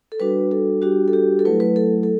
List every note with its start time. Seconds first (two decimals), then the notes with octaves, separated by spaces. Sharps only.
0.12 A4
0.20 G3 D4 F#4 B4
0.51 A4
0.82 G3 D4 F#4 G4
1.08 A4
1.13 G4
1.39 A4
1.45 F#3 A3 E4 B4
1.60 B4
1.76 A4
2.03 A4